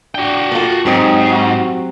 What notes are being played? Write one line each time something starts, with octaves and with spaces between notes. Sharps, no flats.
D4 F#4 G5
A#3 F4 A4
G#2 F#3 C4 D#4 G4
F#4